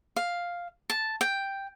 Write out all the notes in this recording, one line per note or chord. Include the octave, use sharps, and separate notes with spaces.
F5
A5
G5